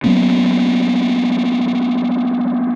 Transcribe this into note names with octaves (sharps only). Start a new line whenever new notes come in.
F#3 A#3 B3 C#4